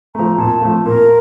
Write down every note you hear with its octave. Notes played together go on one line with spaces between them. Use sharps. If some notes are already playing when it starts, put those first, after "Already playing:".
F3 A3 A#5
A#2 A5
F3 A3
A#2 A#4